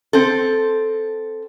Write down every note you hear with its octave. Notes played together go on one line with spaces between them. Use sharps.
C4 A4